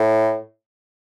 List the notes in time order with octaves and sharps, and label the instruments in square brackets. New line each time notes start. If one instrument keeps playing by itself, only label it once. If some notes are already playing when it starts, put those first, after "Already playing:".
Already playing: [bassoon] A2